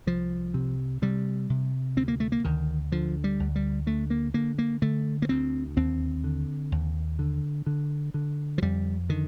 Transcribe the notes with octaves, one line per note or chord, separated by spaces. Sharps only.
C2 F3
C3
C3 G3
C3
D2 C4
A#3
A3
A#3
D2 D#3
D3 F3
G3
D2
G3
D3 A3
A#3
D3 A#3
A#3
D3 A3
A#3
D2 C4
D#2 C4
D3
D#2
D3
D3
D3
F3
F2 G3
D3 D#3